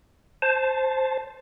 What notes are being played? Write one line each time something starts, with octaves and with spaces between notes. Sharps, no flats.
C5 A5